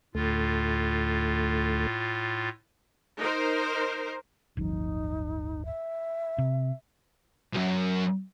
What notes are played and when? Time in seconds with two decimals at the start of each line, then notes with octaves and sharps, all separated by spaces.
0.15 D2 A2 A3 F4
3.18 D#4 A#4 C5
4.57 D1 G1 F3 D#4
5.65 E5
6.38 C3
7.53 B1 F#2